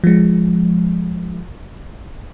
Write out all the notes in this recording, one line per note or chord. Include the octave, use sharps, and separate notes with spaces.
F3 G#3